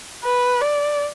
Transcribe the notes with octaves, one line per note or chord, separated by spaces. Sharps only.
B4
D5